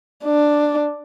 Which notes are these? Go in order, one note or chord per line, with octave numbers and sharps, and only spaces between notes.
D4